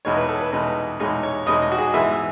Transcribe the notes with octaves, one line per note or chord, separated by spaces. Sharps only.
E2 B2 G#3 D#4 C#5
B4
A4
B4
E2 B2 G#3 D#4
E2 B2 G#3 D#4 C#5
C#5
E2 B2 G#3 D#4 D#5
D#5
F#4
G#4
G#2 E3 G#3 B3 E5
E5